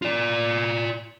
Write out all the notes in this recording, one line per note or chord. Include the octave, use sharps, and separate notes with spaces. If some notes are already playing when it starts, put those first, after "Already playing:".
F4 D5